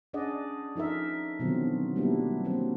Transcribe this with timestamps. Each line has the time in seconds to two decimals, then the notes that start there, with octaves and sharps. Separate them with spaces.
0.13 C#4 D4 G#4 D5 D#5 F#5
0.76 F3 D#4 A4 A#4 E5
1.39 B2 D3 D#3 F3 F#3 C4
1.96 F#3 G3 A#3 B3 D4 E4
2.45 F#3 A#3 C4